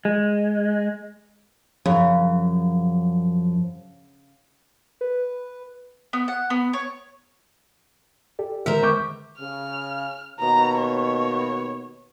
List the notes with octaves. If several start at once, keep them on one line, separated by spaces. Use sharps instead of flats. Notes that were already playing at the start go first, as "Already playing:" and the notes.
G#3
F#2 C#3 F3
B4
B3
F#5
B3
C#5
G4 A4 D5
D3 D#3 G#3 A#4 C5 E5
C#6 D6 G6
C#3 F6
D#2 B2 A#5
C#5